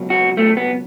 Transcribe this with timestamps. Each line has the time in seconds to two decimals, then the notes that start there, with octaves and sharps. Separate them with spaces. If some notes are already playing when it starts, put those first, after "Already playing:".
Already playing: C#2 B2 F#3
0.10 F#4
0.37 A3
0.57 B3